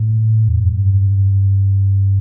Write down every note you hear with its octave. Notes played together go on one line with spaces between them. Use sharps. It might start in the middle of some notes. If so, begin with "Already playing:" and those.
Already playing: A2
E2
F#2
G2